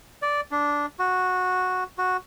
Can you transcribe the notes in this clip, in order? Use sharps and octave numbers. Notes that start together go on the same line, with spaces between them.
D5
D4
F#4
F#4